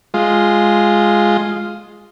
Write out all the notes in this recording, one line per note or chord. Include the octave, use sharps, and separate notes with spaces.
G#3 F4